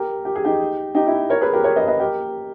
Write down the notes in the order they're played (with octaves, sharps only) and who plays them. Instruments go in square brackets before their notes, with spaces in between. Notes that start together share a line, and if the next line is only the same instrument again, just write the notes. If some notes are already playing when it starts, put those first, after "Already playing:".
Already playing: [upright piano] G4 A#4
G4
G#4
D#4 G4
D#4 G4
E4
A#4 C#5
G#4 B4
G4 A#4
A#4 C#5
B4 D#5
B4 D#5
G4 A#4